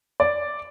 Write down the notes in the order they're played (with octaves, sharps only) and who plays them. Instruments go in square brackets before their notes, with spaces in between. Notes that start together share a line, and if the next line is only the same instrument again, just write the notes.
[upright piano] D5